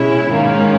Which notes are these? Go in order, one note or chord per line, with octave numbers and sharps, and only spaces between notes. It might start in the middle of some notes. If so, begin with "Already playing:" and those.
Already playing: B2 G#3 C#4 E4
G#2 D#3 A#3 C#4